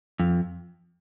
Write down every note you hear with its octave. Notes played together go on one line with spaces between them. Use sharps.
F2